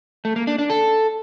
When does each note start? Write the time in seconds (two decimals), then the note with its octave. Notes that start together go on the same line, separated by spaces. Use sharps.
0.25 A3
0.36 A#3
0.47 D4
0.58 D4
0.70 A4